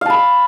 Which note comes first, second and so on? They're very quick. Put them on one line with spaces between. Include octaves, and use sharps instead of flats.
F5 A5 B5